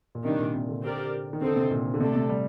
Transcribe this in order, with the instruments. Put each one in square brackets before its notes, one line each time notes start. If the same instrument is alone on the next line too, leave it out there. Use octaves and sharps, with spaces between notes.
[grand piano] A#2
[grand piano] C3 [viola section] D#3 G3 D4
[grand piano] A#2
C3
D3
[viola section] C4 G4 A#4 D5
[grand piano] D#3
[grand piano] D3 [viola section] C4 D#4 A4 C5
[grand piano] C3
A#2
D3
[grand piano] C3 [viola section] A3 D4 A4
[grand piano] C3
G3